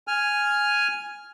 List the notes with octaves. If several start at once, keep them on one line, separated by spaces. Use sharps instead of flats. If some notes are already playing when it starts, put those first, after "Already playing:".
G#5 F6